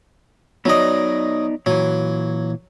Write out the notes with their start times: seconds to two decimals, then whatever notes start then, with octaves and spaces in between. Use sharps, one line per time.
0.65 F#3 B3 D#4 D5 D#5
1.66 A#2 E3 F#3